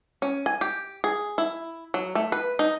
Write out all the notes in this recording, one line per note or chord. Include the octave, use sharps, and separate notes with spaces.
C#4
G#5
G4
G#4
E4
F#3
A3
B4
D#4